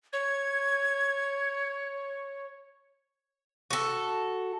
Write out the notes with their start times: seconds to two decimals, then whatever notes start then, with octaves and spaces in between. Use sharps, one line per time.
0.13 C#5 G#6
3.71 F#4 A4